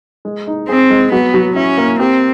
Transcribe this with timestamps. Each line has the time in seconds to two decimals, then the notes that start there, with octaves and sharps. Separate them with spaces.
0.25 G#3
0.47 D#4
0.68 C4 G#4
0.90 G#3
1.12 F#3 B3
1.34 F#3
1.56 C#4 E4
1.78 A#3
1.99 C4 G4